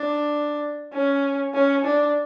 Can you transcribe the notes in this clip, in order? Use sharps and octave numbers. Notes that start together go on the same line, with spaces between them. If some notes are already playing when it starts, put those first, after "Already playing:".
Already playing: D4
C#4
C#4
D4